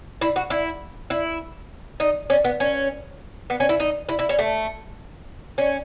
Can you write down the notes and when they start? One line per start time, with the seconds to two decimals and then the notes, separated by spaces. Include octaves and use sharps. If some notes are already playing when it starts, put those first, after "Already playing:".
0.21 E4
0.36 F#4
0.50 E4
1.10 E4
2.00 D#4
2.30 C#4
2.45 B3
2.60 C#4
3.50 B3
3.60 C#4
3.69 E4
3.80 D#4
4.09 E4
4.19 E4
4.29 C#4
4.39 A3
5.58 C#4